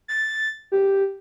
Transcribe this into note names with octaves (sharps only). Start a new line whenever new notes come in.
A6
G4